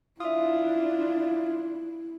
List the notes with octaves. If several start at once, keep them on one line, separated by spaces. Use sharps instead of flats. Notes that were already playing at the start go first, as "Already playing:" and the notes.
D4 E4 F4 E5 D#6